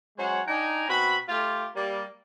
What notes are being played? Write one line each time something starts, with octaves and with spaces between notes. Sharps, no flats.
F#3 G#3 C#4 C5 C#5 F#5
D4 D#4 G5 G#5 A#5
B2 C4 F#4 B5
A3 F4 G4
G3 A#3